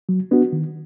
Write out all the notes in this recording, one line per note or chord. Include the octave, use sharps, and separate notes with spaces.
F#3
B3 D4 F#4
D#3